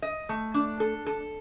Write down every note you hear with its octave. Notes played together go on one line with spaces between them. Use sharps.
D#5
A3
D4
A4
A4